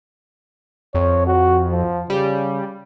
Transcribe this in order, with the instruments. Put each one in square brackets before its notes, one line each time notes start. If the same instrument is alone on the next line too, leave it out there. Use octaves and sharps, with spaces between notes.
[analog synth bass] F2 [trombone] C#5
[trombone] F#4
F3
[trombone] C#3 [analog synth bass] G3